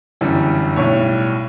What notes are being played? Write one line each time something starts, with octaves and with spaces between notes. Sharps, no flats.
G1 F#2 E3 G3
B1 A2 G3 C#5